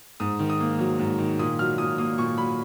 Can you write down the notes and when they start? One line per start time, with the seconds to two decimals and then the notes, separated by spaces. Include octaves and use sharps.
0.20 G#2 D#6
0.39 D#3
0.50 D#6
0.60 A#3
0.79 F#3
0.99 G#2
1.18 D#3
1.39 A#2 D#6
1.59 F#3 F6
1.78 A#2 D#6
1.98 A#3 D#6
2.18 A#2 C#6
2.38 F#3 B5